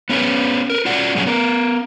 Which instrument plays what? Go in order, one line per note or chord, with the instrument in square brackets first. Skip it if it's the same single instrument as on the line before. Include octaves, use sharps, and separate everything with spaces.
[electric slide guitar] B3 C#4 G#4 B4
A#4 B4
C#4 F4 F#4 D5 F#5
G2 B2 F#3 C#4 D4 G#4
B3 A#4